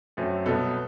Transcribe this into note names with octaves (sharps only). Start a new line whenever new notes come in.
F#2 F#3 A3 C4 A4
C2 B2 F#3 B3 A4